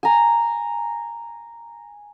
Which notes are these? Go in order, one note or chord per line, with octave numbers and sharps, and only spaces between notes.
G#5 A#5